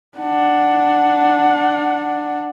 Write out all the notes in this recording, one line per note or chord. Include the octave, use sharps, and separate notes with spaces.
D4 F#5